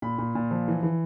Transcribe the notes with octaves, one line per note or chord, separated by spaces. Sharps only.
A#2 B5
A#2
A#2
F3
E3
E3